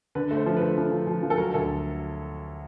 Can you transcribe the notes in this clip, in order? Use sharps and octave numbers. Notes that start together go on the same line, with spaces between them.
D3 B4
A3
C5
F3
A3 B4
F3
F3
F3
F3
A4
F#3 A#4
D2 A4